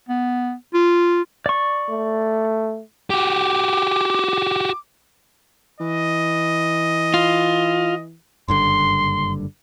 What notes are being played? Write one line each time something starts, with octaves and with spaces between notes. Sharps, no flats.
B3
F4
D5 C#6
A3
F#4 G4 D6
E3 D#5
F4
F#1 G2 D3 C6